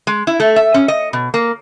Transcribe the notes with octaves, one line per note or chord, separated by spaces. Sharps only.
G#3
E4
A3
E5
C#4
D#5
B2
A#3